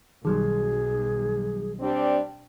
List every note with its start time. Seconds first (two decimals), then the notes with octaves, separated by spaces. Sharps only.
0.25 B1 D#3 F#3 G3 G#4
1.80 G3 C4 D4